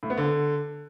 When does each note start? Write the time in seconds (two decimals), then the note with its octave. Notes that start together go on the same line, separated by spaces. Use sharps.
0.03 A2
0.10 B3
0.17 D3